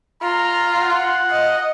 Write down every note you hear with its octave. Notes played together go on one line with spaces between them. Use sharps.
F4 A#5
F#5
D#5